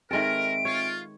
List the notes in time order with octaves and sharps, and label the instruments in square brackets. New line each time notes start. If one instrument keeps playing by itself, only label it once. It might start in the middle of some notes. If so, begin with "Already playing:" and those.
[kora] D#3 G#3 A4 [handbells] C4 E5 [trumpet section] A#4 [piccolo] D7
[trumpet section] F4 [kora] C#5